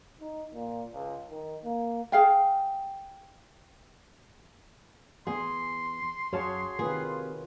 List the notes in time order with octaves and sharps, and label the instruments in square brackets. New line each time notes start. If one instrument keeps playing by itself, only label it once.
[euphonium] D#4
A#2
C#2
D#3
A#3
[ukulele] G#4 F5 G5
[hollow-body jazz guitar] E2 [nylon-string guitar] G#4 [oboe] C6
[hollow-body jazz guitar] F#2 F5 A5 [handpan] F#4 G#4 C#5
[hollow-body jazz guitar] C3 [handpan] D#3 F4 B4 [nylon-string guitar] G#4